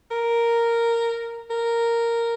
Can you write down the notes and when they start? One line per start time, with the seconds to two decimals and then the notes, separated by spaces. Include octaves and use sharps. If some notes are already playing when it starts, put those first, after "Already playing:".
0.11 A#4
1.50 A#4